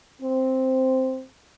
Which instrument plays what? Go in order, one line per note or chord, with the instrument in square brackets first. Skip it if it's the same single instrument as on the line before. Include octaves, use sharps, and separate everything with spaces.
[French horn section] C4